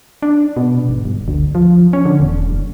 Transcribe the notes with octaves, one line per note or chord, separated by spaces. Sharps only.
D4
B2
G#1
G1
D2
F3
C#4
D3
E1
F#1